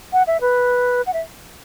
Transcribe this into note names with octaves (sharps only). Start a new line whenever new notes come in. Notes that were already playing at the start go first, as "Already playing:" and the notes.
F#5
E5
B4
F#5
E5